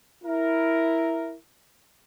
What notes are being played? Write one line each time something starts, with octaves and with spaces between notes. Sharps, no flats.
E4 A#4